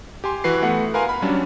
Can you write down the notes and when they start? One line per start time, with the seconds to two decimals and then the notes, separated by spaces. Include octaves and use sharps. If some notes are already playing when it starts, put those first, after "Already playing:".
0.24 G4 G#5 C6
0.44 E3 F#4 B4 C7
0.62 A3 B3 F#5
0.94 A#4 B4 F5 G#5 C6
1.09 B5
1.22 F#3 G3 C#4 D4